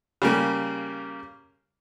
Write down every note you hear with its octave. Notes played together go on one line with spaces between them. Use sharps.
C#3 G3 A#3